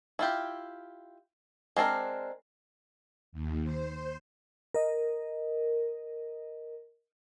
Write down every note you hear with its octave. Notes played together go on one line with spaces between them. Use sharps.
E4 F4 G4
G#3 C4 D4 A#4
D#2
C5
A#4 D#5